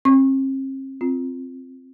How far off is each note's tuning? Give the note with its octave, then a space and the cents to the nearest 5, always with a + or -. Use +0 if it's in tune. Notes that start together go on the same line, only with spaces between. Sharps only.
C4 +45 C#6 -25
C4 +0 F4 +0